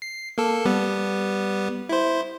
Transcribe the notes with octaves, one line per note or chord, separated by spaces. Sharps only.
C7
A#3 A4
G3 B3
E4 C5